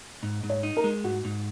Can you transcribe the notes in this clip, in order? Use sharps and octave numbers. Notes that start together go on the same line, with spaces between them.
G#2
G#2
C#5
D#4
A#4
G#3
G#2 F#4
G#2